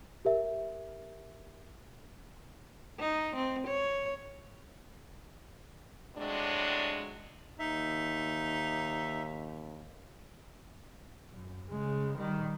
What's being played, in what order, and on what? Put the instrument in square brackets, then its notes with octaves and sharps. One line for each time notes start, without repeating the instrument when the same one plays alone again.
[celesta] G4 A#4 E5
[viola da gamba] D#4
C4
C#5
[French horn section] A2 C3 F#3 G#3 D4
[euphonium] D#2 [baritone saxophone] D#4 [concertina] E5
[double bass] F#2
C#3 G#3
D#3 G3